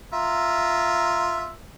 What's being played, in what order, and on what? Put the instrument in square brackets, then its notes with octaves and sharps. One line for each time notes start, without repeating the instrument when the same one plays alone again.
[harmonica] F4 E5 A#5